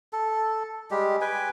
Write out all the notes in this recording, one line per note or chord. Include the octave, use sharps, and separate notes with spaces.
A4
G3 G#3 G4
B4 G5 G#5